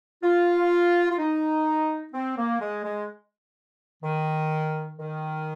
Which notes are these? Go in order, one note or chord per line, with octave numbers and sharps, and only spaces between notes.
F4
F4
D#4
C4
A#3
G#3
G#3
D#3
D#3